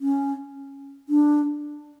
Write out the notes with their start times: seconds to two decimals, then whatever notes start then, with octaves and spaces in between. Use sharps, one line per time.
0.01 C#4
1.09 D4